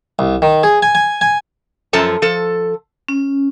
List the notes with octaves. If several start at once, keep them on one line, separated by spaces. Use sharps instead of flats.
C2
D#3
G#4
G#5
G#5
G#5
F#2 F3 A4 A5 A#5
F3 A4
C#4